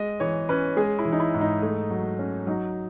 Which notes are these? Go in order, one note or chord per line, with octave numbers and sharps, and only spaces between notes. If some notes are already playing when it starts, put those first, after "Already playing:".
Already playing: G#3 D#5
E3 C#5
C#4 B4
G#3 G#4
E4
E3
D#4
E4
G#2
D#4
A3
F#3
C#4
F#3 D#4